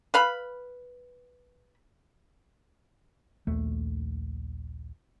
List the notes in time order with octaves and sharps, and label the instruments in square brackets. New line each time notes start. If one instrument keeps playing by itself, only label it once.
[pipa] B4 F5 B5
[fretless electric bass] A#1 D#2 A3